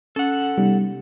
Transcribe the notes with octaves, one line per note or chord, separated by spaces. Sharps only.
C#4 A4 F#5
C3 G3 B3 D#4